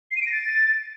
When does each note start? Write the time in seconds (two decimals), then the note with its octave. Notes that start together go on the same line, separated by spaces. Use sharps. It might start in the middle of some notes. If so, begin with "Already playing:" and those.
0.11 C7
0.16 D#7
0.21 D7
0.27 A#6
0.32 A6